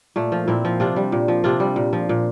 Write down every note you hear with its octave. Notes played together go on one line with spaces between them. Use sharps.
A#2 A3
F3
A#2 C4 E4
F3
C3 D4 F4
G3
A#2
F3
C3 D4 F4
G3
A#2
F3
A#2